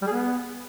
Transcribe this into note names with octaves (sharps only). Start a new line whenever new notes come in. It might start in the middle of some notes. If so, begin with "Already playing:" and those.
G3
G#4
B3